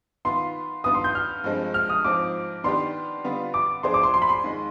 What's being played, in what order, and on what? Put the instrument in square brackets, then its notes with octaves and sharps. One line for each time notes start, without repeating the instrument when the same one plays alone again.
[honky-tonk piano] D#3 B3 F4 B4 [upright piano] C6
[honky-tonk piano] G2 D#3 B3 F4 B4 [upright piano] D#6
[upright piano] C6
G6
F6
[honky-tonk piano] G2 F3 G#3 C4
[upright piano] F6
D#6
[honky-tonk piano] G#2 F3 C4 [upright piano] D6
[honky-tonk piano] D#3 B3 D4 G4 B4 [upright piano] C6
[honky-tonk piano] D3 G3 B3 F4 B4
[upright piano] D6
[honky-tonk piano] F3 B3 D4 G#4 C5 [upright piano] C6
[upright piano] D6
C6
C6
B5
C6
[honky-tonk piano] D#2 D#3 G#3